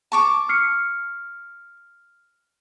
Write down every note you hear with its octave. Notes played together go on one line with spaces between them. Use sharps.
A5 C#6 D6
F6 C7 C#7